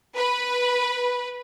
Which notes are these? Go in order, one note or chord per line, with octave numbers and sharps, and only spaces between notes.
B4